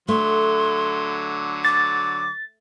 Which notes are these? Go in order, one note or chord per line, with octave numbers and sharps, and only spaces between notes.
D3 F#3 A3 C6
D6 A6